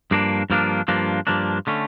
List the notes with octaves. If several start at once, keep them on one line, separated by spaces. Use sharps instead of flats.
G2 F3 A#3 D4
G2 F3 A#3 D4
G2 F3 A#3 D4
G2 F3 A#3 D4
D3 A3 C#4